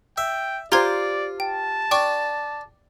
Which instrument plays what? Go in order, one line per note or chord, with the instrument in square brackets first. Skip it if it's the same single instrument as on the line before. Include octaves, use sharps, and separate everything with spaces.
[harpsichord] E5 [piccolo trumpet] G5
[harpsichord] F4 [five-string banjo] G4 C5 [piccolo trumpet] D5 [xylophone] A#5 C6 G#6
[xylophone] G5 [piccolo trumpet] A5
[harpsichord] D4 [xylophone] G5 C#6